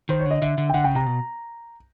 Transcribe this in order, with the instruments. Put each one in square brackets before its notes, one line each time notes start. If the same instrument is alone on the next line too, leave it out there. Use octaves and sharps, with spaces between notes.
[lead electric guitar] D#3 [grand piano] C5
[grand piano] C#5
[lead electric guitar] D3
[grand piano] D#5
[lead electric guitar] D3 [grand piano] E5
[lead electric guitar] D3
[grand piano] G5
[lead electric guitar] D3 [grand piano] F#5
[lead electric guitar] C#3 [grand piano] G5
[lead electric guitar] C3 [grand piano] A#5
[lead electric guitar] B2